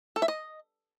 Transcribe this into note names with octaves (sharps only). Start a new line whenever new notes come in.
A4
E5
D#5